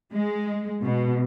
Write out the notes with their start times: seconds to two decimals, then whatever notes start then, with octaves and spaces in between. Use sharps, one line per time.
0.12 G#3
0.84 B2